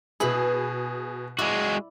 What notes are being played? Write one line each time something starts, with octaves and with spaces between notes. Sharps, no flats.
B2 E4 G#4 B4 B5
G#3 E4 F#4 D5